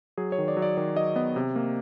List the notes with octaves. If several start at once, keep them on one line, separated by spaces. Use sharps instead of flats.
F#3 G#4
C#5
D#3
D5
F#3
D5
D#3 D5
F#3 D#5
B3 D#5
C3
A#3